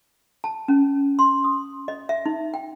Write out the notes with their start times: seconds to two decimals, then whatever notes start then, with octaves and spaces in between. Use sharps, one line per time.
0.44 A5
0.68 C#4
1.19 C6
1.44 D#6
1.88 D#5
2.09 E5
2.26 D#4
2.54 G5